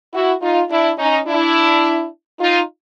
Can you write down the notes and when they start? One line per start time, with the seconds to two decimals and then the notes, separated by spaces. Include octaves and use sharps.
0.13 E4 F#4
0.42 D#4 F4
0.70 D4 E4
0.98 C#4 D#4
1.27 D4 E4
2.40 D#4 F4